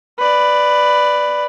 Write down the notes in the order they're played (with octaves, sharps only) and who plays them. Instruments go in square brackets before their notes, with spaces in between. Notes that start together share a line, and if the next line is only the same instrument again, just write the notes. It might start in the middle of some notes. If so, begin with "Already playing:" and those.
[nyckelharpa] B4 D5